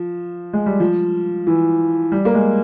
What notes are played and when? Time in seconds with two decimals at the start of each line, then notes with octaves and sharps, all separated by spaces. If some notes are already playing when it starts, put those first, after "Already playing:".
Already playing: F3
0.53 G#3
0.66 G3
0.80 F3
1.47 E3
2.12 G3
2.25 A#3
2.35 G#3